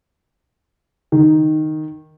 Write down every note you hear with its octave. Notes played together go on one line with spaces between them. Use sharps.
D#3